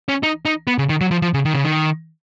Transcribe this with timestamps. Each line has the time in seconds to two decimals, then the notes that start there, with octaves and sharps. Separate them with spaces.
0.09 C#4
0.23 D#4
0.45 D#4
0.67 B3
0.78 C#3
0.89 D#3
1.01 F#3
1.11 F3
1.22 F3
1.34 C#3
1.45 D#3
1.54 C#3
1.65 D#3